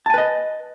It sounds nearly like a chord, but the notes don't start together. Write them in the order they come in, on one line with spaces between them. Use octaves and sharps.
A5 G#5 B4 D#5